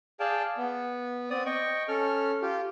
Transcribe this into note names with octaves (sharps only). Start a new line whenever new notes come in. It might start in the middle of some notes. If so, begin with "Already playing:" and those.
G#4 D5 F5 G5 A5
B3
C4 D5 D#6
D#5 G5 C#6
C#4 A4 F6
F4 G4